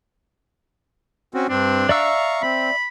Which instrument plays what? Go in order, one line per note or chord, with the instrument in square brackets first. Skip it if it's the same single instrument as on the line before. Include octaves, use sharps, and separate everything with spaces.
[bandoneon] C4 C#4 F#4
[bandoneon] G2 C4 [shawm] D4
[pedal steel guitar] D5 E5 E6 [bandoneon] F5 A#5 C#6
[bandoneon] C4 [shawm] B5